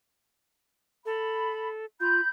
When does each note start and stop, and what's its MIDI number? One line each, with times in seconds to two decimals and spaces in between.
1.06 1.85 69
1.06 1.67 83
2.00 2.21 65
2.00 2.29 83
2.00 2.29 91